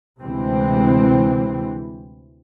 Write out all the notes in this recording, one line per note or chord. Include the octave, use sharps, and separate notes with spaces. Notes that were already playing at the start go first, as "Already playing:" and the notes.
D2 C3 E3 G#3 C4